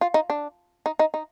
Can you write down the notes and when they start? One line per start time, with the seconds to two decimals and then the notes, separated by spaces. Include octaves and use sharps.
0.01 F4
0.14 D#4
0.30 D4
0.86 D#4
0.99 D#4
1.14 D#4